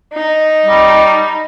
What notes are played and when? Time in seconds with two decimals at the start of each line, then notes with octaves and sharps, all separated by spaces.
0.13 D#4
0.66 G3